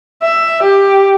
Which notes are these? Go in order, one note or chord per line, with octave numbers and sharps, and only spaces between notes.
E5
G4